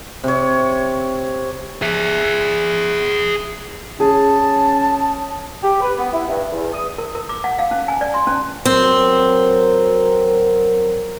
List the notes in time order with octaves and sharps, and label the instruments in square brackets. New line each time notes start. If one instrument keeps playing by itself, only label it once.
[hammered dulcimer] C3 C#5
[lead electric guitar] G#4 E5
[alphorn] C#4 [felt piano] G#4 [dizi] A5
[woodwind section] G4
B4
B3
E4
G2
E2
D#6
[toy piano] A#4
A#4
D6
F#5
F5
C#4
G#5
D5
C6
C#4
[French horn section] F#3 A#4 [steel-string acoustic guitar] C4